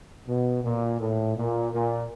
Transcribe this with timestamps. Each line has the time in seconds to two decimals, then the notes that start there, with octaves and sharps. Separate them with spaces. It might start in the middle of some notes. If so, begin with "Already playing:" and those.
0.28 B2
0.64 A#2
1.01 A2
1.37 A#2
1.73 A#2